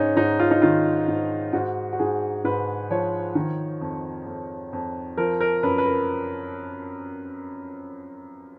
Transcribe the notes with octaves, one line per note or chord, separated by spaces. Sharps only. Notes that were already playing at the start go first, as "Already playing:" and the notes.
Already playing: G#2 C#4 D#4
G#2 D#4
F4
D#4
D#3 F4
G#2
G#2 F#4
F#4
G#2 G#4
G#2 B4
F3 C#5
D#3
F2
F2
F2
F3 A#4
A#4
F#2 B4
B4
A#4